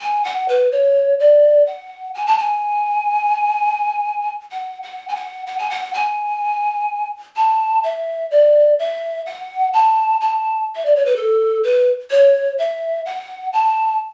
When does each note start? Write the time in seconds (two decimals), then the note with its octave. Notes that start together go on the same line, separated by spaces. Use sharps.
0.01 G#5
0.24 F#5
0.49 B4
0.72 C#5
1.20 D5
1.67 F#5
2.15 G#5
2.26 A5
2.38 G#5
4.52 F#5
4.83 F#5
5.08 G#5
5.15 F#5
5.47 F#5
5.59 G#5
5.70 F#5
5.94 G#5
7.36 A5
7.83 E5
8.31 D5
8.79 E5
9.26 F#5
9.73 A5
10.21 A5
10.76 E5
10.86 D5
10.96 C#5
11.06 B4
11.16 A4
11.63 B4
12.11 C#5
12.58 E5
13.06 F#5
13.53 A5